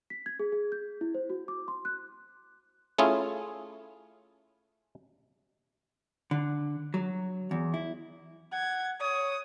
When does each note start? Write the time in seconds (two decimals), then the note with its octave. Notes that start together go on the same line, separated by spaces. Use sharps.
0.10 B6
0.26 G#6
0.39 G#4
0.52 G#4
0.72 G6
1.01 E4
1.14 C5
1.30 F#4
1.48 D6
1.68 C6
1.85 F#6
2.98 A3 C#4 E4 F4 G#4
6.31 D3
6.94 F#3
7.51 E2
7.74 E4
8.52 F#5 G#6
9.01 C#5 D#6